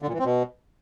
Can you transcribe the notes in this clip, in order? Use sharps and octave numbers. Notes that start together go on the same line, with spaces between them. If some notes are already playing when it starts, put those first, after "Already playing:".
D3
A#2
E3
C4
B2